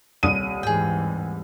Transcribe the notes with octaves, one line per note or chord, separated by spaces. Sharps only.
D#1 C2 D#6 D#7
G#2 E3 G#4 G5